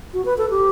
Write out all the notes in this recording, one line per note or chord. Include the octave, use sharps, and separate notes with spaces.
F#4
B4
A4
G4